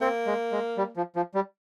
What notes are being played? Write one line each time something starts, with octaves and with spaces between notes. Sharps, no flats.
A#3 C4
G#3
G#3
G3
F3
F3
G3